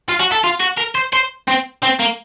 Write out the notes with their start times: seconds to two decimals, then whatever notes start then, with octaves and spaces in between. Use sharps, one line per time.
0.09 F4
0.20 F#4
0.32 A4
0.44 F4
0.60 F#4
0.78 A#4
0.95 C5
1.13 C5
1.48 C4
1.83 C4
2.00 A#3